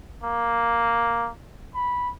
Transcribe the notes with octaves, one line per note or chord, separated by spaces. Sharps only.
A#3
B5